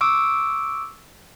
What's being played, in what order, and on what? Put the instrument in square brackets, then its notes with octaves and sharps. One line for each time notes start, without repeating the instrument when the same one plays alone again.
[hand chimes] C#6 D6 E6 D7